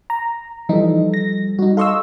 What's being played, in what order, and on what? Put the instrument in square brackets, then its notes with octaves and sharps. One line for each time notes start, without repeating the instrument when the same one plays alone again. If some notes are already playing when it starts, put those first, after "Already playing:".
[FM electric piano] A#5
[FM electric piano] E3 D#4 [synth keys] F3 G3 A4
[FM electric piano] A#6
[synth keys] G3 [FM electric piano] D#4 F#4
[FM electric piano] A4 D#5 E6 [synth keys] F5 C6 C#6